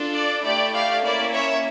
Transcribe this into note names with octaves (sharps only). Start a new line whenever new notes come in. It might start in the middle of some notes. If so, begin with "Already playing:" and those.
Already playing: D4 F4 A4
D5
A3 E4 G4 D5
D5 F5
A#3 C#4 E4 D5
C#5 E5